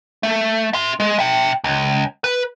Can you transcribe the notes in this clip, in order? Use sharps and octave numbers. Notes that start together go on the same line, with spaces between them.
A3
E5 C6
G#3
E5 G5
C#2
B4